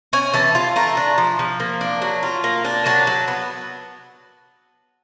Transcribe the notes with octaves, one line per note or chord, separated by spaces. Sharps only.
C#4 G#5
E3 A5
F4
A3 A#5
D4
F3
F3
A#3
D4
F#3
F4
A#3
D4
F#3 A5
F#3
B3